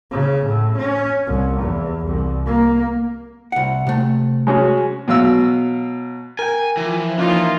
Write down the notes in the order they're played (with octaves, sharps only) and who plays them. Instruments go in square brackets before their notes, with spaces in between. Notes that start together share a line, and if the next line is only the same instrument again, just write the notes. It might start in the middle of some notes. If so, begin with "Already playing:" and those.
[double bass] C#3
A2
C#4
C2
E2
C2
A#3
[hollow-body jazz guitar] C2 F#5
C3 A3
[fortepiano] G#3 C#4 F#4
B2 F#3 F5 E6
[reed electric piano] A#4 G5 [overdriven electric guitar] G#5
[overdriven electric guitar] E3 [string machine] F3
[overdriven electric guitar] E3 [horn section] A#3 D#4 F4 [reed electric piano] C#4